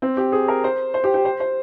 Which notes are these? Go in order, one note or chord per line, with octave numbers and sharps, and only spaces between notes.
C4
G4
G#4
A#4
C5
C5
G4
G4
C5
C5